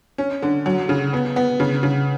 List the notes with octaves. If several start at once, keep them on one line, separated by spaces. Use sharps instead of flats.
C#4
D3
F#3
C#3
B3
B3
C#3
C#3